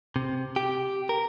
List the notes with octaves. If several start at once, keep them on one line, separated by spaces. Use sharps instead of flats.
C3
G4
A#4